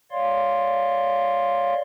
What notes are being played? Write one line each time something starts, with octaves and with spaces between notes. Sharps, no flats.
C#5 D5 F5 C6